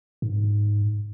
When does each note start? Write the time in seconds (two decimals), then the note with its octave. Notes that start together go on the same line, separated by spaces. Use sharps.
0.22 G#2